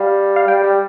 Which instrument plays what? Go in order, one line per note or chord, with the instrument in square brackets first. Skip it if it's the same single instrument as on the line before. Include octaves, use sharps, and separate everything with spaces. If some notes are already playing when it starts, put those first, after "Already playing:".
Already playing: [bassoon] G3 [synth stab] F5
[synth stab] F5
[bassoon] G3 [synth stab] G5
[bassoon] G3